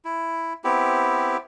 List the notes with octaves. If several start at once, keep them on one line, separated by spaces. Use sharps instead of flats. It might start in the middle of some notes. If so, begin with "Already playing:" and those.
E4
B3 C4 E4 G4